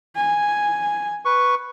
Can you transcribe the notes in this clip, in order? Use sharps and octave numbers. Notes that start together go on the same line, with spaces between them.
G#5
B4 C#6